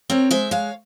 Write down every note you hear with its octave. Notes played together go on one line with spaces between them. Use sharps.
C4 A#4 C#5
G#3 C5 E5
G#3 C#5 F5